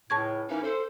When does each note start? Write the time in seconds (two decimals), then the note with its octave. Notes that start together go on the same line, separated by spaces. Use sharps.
0.10 C#2 A2 A5 C#6 G#6
0.49 E3 A#3 C#4 D#4
0.63 A4 C5